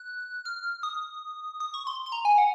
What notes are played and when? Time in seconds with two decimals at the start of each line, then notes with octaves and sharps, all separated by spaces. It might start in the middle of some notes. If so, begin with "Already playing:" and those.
Already playing: F#6
0.45 F6
0.83 D#6
1.60 D#6
1.74 C#6
1.87 C6
2.06 C6
2.12 A#5
2.25 G#5
2.38 F#5